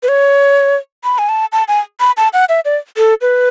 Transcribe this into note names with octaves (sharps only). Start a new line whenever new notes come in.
B4
C#5
B5
G#5
A5
A5
G#5
B5
A5
F#5
E5
D5
A4
B4